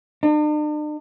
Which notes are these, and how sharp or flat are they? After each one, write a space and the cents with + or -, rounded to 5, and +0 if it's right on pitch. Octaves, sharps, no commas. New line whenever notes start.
D4 +45